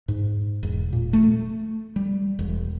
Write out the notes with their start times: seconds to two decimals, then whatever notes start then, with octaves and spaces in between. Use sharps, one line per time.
0.08 G#2
0.63 E1
0.93 A#2
1.13 A3
1.96 G3
2.39 E1